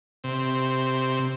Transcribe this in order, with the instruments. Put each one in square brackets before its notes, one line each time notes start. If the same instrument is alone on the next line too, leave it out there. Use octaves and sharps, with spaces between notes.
[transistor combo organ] C3